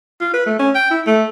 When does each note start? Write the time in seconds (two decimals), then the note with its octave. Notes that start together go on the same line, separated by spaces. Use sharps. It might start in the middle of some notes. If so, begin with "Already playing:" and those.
0.21 F4
0.34 B4
0.46 A3
0.59 C#4
0.75 G5
0.90 E4
1.07 A3